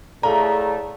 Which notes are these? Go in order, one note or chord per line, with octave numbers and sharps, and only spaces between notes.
A2 A3 G#4 D5 F5 A#5